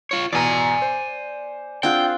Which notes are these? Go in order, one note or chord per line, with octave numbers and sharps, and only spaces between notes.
F4 C#5
E2 B2 D5 G#5 A#5
C5
C4 D4 F4 G#4 F#5 G5 F#6